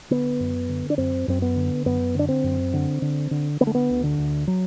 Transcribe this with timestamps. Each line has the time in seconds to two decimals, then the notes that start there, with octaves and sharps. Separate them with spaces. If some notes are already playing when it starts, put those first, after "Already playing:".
0.10 D3 B3
0.40 F#2
0.69 D3
0.90 D4
0.98 F#2 C4
1.28 F#2 C4
1.42 B3
1.56 D3
1.86 F#2 B3
2.15 D3 D4
2.29 C4
2.44 F#2
2.73 D3
3.02 D3
3.31 D3
3.60 D3 B3
3.67 A3
3.75 B3
3.90 D2
4.04 D3
4.18 D2
4.47 F#3